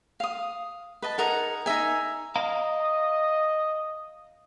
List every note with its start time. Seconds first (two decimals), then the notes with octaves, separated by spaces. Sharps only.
0.20 F5 D#6
1.02 B4 D#5 A5
1.18 D#4 G#4 A#4 F#5
1.66 D#4 A#4 E5 G#5
2.36 D#5 F5 A#5